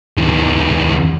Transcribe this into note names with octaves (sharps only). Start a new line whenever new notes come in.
E2 D#3